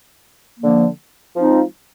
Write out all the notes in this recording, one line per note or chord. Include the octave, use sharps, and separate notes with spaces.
D3 F3 A#3
F3 G#3 C4 D#4